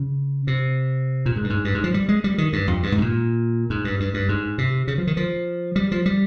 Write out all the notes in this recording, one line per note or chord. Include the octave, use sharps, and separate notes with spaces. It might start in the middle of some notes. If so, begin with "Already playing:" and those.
Already playing: C#3
C3
A#2
G#2
G2
G#2
G2
G#2
F3
G3
G#3
G3
D#3
G2
F2
G2
G#2
C3
A#2
G#2
G2
G2
G2
G#2
C3
C#3
F3
D#3
F3
G3
F3
G3